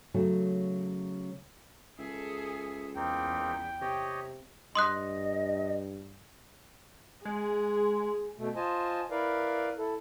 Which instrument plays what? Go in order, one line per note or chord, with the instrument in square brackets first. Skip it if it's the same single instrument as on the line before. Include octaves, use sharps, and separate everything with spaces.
[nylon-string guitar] C#3 F#3 A3
[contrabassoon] C#2 [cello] G#4 A4 [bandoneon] E5
[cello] E2 [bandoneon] A#3 C4 D#4 [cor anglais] G5
[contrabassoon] C3 [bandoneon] G4 C#5 D#5
[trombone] G2 [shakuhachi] D#5 [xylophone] C6 D#6 F#6
[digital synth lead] G#3 [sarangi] G#4
[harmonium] B2 A3
F4 C5 D#5 G#5 A5
E4 A#4 B4 D5 F5
E4 A4